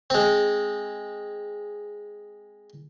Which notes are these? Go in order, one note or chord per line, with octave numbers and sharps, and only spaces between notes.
G#3 C4